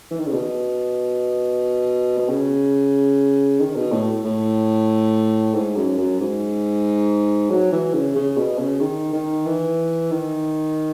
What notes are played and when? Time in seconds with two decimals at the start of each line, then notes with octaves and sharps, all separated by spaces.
0.11 E3
0.19 D#3
0.26 C#3
0.33 B2
2.18 B2
2.29 C#3
3.60 D#3
3.75 B2
3.92 A2
4.24 A2
5.54 G#2
5.76 F#2
5.98 F#2
6.20 G#2
7.50 F#3
7.72 E3
7.93 C#3
8.16 C#3
8.37 B2
8.59 C#3
8.80 D#3
9.13 D#3
9.46 E3
10.11 D#3